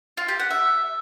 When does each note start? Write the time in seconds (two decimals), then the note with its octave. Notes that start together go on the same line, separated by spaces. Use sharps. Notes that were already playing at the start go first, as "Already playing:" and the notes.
0.17 F4
0.28 G4
0.40 F#5
0.51 E5